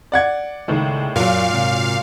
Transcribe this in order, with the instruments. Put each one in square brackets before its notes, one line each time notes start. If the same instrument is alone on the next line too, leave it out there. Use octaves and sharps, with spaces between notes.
[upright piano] D5 F#5 G#6
[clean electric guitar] C#2 A#3 [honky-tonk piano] A2 D#3 G#3
[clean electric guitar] F#2 [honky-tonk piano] A#2 F#3 [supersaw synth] F5
[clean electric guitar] G#2 C3